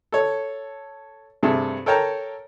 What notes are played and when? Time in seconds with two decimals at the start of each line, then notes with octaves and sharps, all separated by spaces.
0.12 A4 C#5
1.43 G2 C3 A3 G#4 A4 E5
1.86 A4 A#4 C#5 G5 A5 A#5